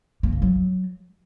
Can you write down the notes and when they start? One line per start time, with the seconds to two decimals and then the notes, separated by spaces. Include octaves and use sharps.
0.23 A#3
0.33 C#3
0.42 F#3